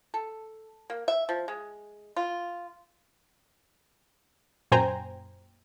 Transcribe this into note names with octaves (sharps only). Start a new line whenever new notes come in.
A4
A#3
E5
F3
G#3
F4
F#2 A#2 C5 G5 G#5 A#5